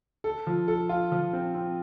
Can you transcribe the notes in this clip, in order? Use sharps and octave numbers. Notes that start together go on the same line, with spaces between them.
A4
F3
A4
F4
F3
C4
C4